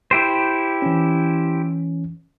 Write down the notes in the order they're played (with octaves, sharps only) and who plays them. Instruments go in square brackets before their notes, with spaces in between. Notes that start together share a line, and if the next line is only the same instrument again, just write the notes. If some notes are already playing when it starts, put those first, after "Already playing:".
[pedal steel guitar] E4 G4 C5
[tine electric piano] E3 C#4